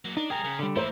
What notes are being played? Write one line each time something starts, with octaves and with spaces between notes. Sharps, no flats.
F#3 A#3
D4 D#4
G3 G#4 A#4 G5 A#5
C#3
D3 G3
A1 A3 A#3 E4 C5 E5 A#5